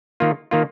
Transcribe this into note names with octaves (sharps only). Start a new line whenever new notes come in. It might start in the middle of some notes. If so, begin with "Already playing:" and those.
D#3 A#3 F4
D#3 A#3 F4